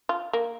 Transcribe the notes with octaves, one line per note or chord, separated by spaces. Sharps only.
F4
A#3